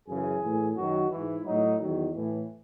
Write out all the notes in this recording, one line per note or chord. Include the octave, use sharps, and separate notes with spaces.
F#2 C#3 E3 G#4
A2 E3
F#2 D#3 F#3 F#4
G#2 E3 E4
A2 F#3 D#4
E2 D#3 F#3
A2 E3